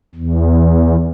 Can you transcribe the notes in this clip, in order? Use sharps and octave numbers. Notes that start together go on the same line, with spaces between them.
E2